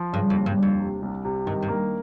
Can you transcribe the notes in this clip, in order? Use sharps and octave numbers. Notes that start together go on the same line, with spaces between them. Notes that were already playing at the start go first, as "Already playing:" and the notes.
Already playing: F3
G2 C#3
F2
D#2
G2
D#2
F2
C3
C2
C3
G2 D#3
G2
A#3